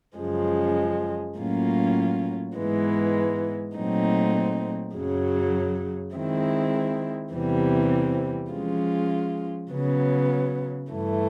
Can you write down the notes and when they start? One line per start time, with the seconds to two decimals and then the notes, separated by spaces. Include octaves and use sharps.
0.17 F#2 C#3 F3 G#3
1.37 A2 F#3 A#3 C#4 F4
2.56 G#2 E3 G#3 B3
3.76 A#2 F#3 A3 C4 D#4
4.95 F#2 C#3 F#3
6.14 D#3 G#3 C4 E4
7.33 E2 C3 E3 G3 C4
8.52 F3 G#3 C#4 F4
9.72 C#3 F#3 B3
10.90 G2 E3 A3